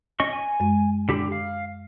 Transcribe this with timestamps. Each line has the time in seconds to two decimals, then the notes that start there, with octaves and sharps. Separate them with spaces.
0.20 C#4 D#5 C#6
0.33 G#5
0.60 F#2 G#3
1.09 D3 G4 B5
1.32 F5